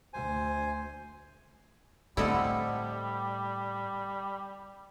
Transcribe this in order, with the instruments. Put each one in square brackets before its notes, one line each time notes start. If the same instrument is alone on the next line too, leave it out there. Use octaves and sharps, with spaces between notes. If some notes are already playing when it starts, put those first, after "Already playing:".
[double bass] D2 [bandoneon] C5 G#5
[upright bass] A2 [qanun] D3 C4 A4 [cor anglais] G3 [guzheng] E4 D#5 F#5